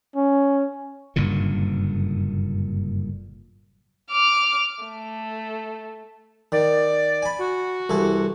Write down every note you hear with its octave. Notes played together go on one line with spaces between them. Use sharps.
C#4
F#1 G2 A#2 D3
D6 F6
A3
D#3 D5
G#5 B5
F#4
C2 E3 A4